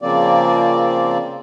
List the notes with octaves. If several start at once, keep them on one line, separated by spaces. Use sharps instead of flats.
C#3 F3 A#3 C4 D5